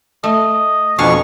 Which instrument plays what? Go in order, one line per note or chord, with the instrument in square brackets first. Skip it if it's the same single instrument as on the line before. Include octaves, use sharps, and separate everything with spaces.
[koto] A3 [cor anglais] D#5
[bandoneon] F2 B2 C#6 [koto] D4 F5 G#5